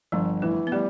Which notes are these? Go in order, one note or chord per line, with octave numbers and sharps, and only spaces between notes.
G1 F3
E3 A3
B3
G3 A3